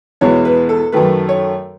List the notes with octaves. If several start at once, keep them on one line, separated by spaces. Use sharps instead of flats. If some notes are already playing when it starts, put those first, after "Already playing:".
E2 B2 G#3 B3 C#5
B4
A4
F#2 D#3 A3 B4
C#5